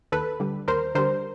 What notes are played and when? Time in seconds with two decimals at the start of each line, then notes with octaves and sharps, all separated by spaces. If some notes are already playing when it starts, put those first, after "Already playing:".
0.12 D#2 A4 B4
0.40 D3 G3
0.68 D#2 A#4 C5
0.95 D3 G3 A#4 C5